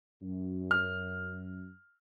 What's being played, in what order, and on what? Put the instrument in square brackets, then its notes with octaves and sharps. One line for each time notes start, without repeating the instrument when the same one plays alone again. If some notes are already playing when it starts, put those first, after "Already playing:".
[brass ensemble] F#2
[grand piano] F6